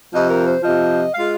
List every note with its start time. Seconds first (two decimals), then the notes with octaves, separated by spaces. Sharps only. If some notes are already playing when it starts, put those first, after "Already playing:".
0.12 F2 C3 F3 D#5
0.29 A#4
0.46 C5
0.63 F2 C3 F3 D#5
1.14 G#3 F4 F5